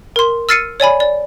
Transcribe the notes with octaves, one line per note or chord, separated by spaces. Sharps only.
A#4 C6
E6 F6 A6 C7 C#7 D#7
C#5 D5 G#5 B5
D5